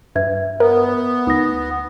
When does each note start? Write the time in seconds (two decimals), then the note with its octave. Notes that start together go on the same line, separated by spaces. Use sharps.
0.15 G2 B4 E5 G#6
0.60 B3 A#4
1.27 D2 D#4 D#6 A#6